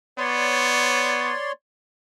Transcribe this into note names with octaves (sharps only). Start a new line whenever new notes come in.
B3 C#5 D5 C6